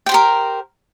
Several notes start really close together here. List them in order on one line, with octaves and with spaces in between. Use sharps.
G5 C5 G4 A#4